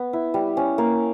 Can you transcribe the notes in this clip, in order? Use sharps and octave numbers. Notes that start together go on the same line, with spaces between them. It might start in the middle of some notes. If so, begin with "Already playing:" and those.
Already playing: B3
E4
G3
C#4
A#3